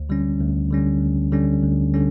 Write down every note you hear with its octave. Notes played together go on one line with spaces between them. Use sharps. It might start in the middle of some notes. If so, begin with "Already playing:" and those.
Already playing: D2
D3 G3 C#4
D2
D3 G3 C#4
D2
D3 G3 C#4
D2
D3 G3 C#4